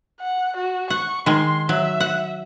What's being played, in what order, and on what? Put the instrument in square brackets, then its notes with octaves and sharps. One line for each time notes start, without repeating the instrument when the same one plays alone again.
[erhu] F#5
F#4
[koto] F#5 [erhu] C#6
[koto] D#3 G#3 [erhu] C6
[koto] F#3 [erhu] E5
[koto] F#5